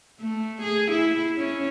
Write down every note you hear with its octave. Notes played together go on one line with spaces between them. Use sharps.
A3
G#4
E4
C#4